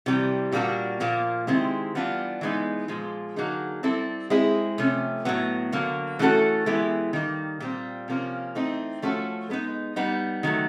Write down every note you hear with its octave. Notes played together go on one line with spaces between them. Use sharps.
C3 E3 G3
A#2 G3 A#3 D4 F#4
A#2 F3 A#3
D#3 G#3 C4 E4 G4
E3 G3 B3 D4 F4
E3 G#3 B3 D#4
A#2 F3 G#3
D3 F#3 A#3 D#4 G#4
G3 C4 E4 A4
G#3 C4 E4 G#4
C3 F3 A3 C#4
A2 F#3 B3
D3 F#3 A#3
E3 A3 C#4 F#4 A4
E3 G#3 B3 E4 G4
D#3 G3 A#3
A#2 G3 C4
C3 F3 A#3 C#4
E3 A3 C4 D#4
F3 A3 C#4 F#4 A4
G#3 B3 D#4
G3 B3 D#4
D#3 F#3 A3